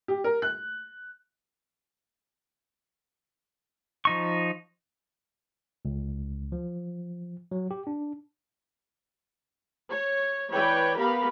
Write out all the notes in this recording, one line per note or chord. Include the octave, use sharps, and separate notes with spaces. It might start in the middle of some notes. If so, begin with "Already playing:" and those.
G4
A#4
F#6
F3 D#4 C#6
C#2
F3
F#3
G4
D4
C#5
E3 B4 C#5 D5 G5
B3 G4 A#4 F5 B5